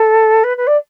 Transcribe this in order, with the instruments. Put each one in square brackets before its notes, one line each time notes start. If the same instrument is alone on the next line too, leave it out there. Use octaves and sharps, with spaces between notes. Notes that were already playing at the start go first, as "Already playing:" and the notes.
Already playing: [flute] A4
B4
B4
D5